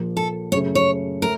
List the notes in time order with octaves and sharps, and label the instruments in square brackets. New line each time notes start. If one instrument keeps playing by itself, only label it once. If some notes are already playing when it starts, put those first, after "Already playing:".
Already playing: [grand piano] A#1 A#2 F3 A#3
[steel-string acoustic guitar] A4
[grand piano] F#2 C#3 A3 [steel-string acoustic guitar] C#5
[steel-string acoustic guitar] C#5
[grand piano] A3 [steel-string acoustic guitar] A#4